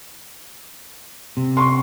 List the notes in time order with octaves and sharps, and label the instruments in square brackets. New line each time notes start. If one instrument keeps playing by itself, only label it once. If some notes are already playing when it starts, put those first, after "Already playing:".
[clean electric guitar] C3
[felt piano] C6 C#6